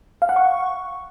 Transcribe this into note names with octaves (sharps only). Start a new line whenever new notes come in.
F5
F#5
C#6